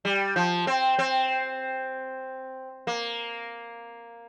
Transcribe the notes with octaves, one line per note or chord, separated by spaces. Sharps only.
G3
F3
C4
C4
A#3